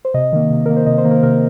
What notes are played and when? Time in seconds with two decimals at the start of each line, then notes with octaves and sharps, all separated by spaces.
0.05 C5
0.14 C3 D#5
0.33 D#3 A#3
0.50 C3
0.66 D#3 A#3 A#4
0.77 C5
0.86 C3 D#5
0.98 C5
1.05 D#3 A#3
1.11 A#4
1.23 C3 A#4